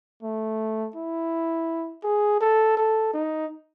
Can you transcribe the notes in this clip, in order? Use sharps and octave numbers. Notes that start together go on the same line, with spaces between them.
A3
E4
G#4
A4
A4
D#4